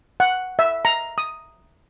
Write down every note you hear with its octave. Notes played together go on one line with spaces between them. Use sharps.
F#5
E5
A#5
D#6